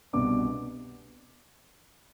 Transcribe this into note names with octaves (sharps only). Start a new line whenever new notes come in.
C2 B2 B3 D4 D6